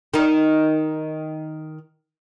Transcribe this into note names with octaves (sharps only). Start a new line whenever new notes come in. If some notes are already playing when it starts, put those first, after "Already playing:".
D#3 D#4